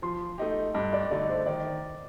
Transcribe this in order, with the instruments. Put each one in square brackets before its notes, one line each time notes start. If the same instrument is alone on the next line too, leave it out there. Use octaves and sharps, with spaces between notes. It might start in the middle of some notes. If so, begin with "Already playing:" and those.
[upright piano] F3 [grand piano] C6
[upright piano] A3 D#4 G4
[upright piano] G2 [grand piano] D#5
[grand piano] D5
[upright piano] D3 A3 D#4 [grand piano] D5
[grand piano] C5
[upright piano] D#3 [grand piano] D5